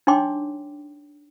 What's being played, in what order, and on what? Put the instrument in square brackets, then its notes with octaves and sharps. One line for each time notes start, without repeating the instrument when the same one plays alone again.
[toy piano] D4 D#4 C#5 G5 C6 D6